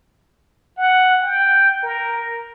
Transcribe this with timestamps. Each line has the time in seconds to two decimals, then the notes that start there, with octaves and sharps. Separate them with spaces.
0.77 F#5
1.22 G5
1.83 A#4